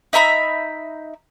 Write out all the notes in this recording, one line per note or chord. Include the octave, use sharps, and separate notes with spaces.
D#4 E5 A#5 B5